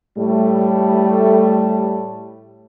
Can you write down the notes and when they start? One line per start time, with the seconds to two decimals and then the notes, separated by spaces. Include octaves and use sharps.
0.17 A2 G3 A3